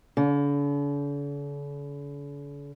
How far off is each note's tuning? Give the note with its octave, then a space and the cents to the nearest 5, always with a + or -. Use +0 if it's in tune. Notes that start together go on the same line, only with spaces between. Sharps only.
D3 -45